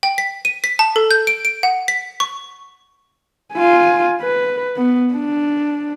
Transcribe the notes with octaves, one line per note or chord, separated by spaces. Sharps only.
G5
B6
D#7
B6
A5
A4
G6
D7
D7
F#5
B6
C#6
F4 G#5
B4
B3
D4